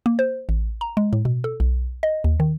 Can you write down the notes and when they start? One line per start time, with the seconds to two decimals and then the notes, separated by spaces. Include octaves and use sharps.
0.06 A#3
0.19 C5
0.49 A1
0.81 A#5
0.97 G#3
1.13 A2
1.25 B2
1.44 A4
1.60 B1
2.03 D#5
2.24 D#2
2.40 D#3